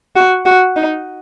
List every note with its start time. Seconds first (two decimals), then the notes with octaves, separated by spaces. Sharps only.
0.16 F#4
0.46 F#4
0.76 D#4